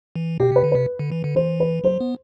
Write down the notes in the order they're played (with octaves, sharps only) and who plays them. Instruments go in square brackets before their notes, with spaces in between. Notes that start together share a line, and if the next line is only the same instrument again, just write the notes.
[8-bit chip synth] E3
[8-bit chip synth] B2 [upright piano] G4
[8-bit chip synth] C3 [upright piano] B4
[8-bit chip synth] D3
[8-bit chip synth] C3 [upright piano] B4
[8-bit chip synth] D3
E3
D3
[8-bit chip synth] E3 [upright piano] C5
[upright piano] B4
[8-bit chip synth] F#3 [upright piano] C5
[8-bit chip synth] B3